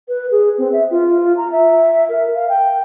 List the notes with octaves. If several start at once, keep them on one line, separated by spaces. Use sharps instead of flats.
B4
G#4
C4
E5
F4
A#5
E5
A#4
F5
G5